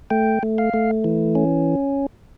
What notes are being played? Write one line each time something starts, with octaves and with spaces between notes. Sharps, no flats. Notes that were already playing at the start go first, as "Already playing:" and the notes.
A3 G5
A3
F5
A3
E3
C#4